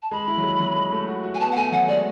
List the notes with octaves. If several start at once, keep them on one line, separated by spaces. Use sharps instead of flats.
A5
G#3 B5
E4
F#3
G#3
F#3
G#3
A3
F#4
F#4
G#5
B3 A5
F#5
A3 G#5
F#3 F#5
G#3 D5